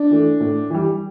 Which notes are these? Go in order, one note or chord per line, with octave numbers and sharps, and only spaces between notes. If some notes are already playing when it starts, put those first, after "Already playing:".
Already playing: D4
E3 A3
A2
E3 G3